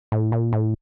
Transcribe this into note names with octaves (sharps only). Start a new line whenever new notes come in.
A2
A#2
A2